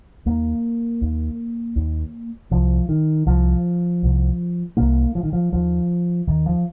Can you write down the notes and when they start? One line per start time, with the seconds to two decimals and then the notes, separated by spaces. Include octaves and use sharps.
0.26 D#2 A#3
1.01 D#2
1.76 D#2
2.51 C2 C3 F3
2.89 D#3
3.26 C2 C3 F3
4.02 C2 C3
4.77 C2 C3 A#3
5.15 F3
5.23 D#3
5.33 F3
5.53 D#2 F3
6.27 D#2 D#3
6.46 F3